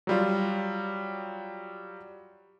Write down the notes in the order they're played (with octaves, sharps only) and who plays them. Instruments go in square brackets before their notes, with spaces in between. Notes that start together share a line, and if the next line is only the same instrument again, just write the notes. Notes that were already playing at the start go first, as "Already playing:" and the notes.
[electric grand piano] F#3 G3 F4